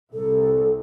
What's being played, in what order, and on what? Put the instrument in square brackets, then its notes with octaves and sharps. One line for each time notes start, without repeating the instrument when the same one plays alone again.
[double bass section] C2 [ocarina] A4